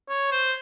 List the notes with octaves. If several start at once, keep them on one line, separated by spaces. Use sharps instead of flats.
C#5
C5